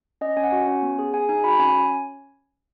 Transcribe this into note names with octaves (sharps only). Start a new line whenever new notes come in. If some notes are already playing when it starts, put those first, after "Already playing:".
C#4 D#5
C#4 G#5
F#5
F#4 G#5
C#4
B3
G#4
G#4 G#5
D#4 G#5
F#4 B5
C#4 G#5